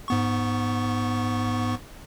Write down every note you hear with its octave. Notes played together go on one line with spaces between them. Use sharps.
G#2 B3 C#6